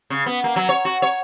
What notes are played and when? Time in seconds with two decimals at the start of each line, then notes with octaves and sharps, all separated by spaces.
0.10 C#3
0.26 B3
0.44 A#3
0.56 F#3
0.69 C#5
0.85 F#4
1.02 C#5